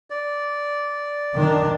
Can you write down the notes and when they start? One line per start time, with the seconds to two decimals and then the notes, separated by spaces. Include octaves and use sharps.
0.10 D5
1.34 D#3 D4